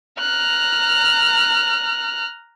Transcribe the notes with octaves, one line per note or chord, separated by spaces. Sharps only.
A#5 F6 F#6